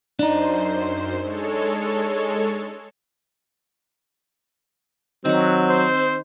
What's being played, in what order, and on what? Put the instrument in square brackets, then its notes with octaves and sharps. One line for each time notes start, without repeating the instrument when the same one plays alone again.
[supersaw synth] F#2 C5 [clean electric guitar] D4 D#4
[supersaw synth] G#3 A4 C#5
[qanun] D#3 F#5 [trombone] F#3 [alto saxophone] C4
[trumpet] C5